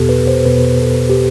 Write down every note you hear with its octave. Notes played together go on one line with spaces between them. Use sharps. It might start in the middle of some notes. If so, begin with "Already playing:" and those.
Already playing: E2 B2 B3 G4 A4
B4
C5
E2 B2 B3 B4
A4
G4